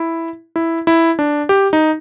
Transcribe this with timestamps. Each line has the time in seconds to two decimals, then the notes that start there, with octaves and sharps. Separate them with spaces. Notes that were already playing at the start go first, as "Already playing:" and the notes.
Already playing: E4
0.56 E4
0.87 E4
1.19 D4
1.49 G4
1.73 D#4